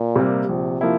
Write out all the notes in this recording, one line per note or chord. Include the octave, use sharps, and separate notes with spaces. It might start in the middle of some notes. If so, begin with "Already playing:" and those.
Already playing: A#2
C3 G3 A#3
A#1 C3
F3 A#3 E4